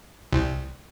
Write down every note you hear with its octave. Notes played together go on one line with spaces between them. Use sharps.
C2